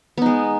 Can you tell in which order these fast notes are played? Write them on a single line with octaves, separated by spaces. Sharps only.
B3 D#4 G#3